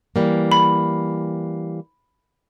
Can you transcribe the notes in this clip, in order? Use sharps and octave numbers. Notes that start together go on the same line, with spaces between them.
E3 G3 A#3
B5